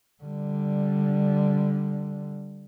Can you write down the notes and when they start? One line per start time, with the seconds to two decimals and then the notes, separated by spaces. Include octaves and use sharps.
0.23 D3 G3